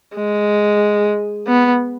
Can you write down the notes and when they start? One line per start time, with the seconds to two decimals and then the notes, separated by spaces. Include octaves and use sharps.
0.16 G#3
1.47 B3